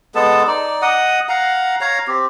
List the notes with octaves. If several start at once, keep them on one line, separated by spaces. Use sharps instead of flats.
G#3 B3 A4 A5
D#4 D5
D#5 F#5 D#6
F5 F#5 A#5
C#5 F5 A#5
C4 G4